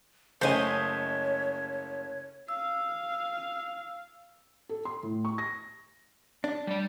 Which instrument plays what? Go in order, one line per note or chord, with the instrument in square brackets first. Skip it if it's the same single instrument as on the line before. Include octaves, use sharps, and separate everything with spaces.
[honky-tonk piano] F#1 [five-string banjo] A3 C#4 G#5 [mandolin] C5 D#5 [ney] C#5
[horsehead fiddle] F5 [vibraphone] E6
[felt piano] A4
C6
A2
C#6
A#6
[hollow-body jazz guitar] D4
[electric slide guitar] G3 D5